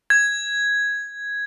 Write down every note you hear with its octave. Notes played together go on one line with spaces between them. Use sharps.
G#6